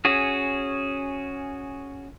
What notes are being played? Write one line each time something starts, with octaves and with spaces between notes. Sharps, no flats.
C#4 F#4 G#4